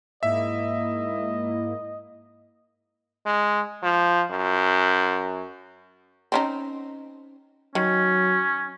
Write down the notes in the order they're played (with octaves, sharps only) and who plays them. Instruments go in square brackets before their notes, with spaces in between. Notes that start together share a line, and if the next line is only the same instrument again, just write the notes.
[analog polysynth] G#2 A#3 E4 [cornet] D#5 [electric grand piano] E5
[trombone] G#3
F3
F#2
[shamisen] C4 C#4 D#4
[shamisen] D#3 [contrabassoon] F#3 [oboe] C#4